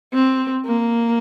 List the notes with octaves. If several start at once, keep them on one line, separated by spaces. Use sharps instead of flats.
C4
A#3